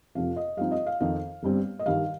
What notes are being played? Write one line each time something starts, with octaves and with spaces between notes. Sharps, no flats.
F2 C3 F3 F5
D#5
G2 F3 C4 D#4 F5
D#5
F5
F2 D#3 C4 D#4 F5
G1 G2 G3 C4
D#5
G2 D#3 G3 F5